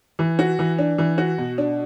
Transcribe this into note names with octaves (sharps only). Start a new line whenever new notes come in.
E3
F#4
E3
D4
E3
F#4
B2
D4